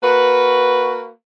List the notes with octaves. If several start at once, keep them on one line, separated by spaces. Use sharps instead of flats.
A#3 F#4 B4